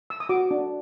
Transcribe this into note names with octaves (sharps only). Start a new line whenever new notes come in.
E6
D#6
F#4 D6
D4